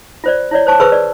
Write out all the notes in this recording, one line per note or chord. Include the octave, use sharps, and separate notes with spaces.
F4 C5 D5
E4 C#5 D5
C5 A5 C#6
G#4 B4 C5 B5 C#6 E6
D5